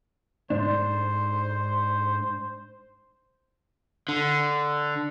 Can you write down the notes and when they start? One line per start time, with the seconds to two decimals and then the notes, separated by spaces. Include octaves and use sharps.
0.50 G#2 D4 C5
4.09 D3